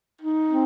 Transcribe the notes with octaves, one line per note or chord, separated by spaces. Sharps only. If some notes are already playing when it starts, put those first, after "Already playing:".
D#4
C4